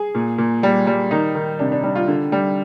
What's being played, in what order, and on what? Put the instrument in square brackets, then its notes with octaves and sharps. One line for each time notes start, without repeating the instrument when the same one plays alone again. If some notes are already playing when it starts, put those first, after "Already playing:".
Already playing: [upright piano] G#4
A#2
A#2
G3
G3
D#3 D#4
D#3
C3 D4
D4
G3 D4
F4
D3
G3